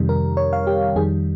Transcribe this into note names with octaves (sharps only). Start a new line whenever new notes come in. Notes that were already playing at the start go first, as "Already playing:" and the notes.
Already playing: F2 C3 D#3 G3
A#4
C#5
F5
G4
F2 D#3 G3 G#4